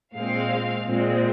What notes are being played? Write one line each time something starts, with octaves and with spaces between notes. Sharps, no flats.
A#2 G#3 C4 F5
A#2 G#3 C4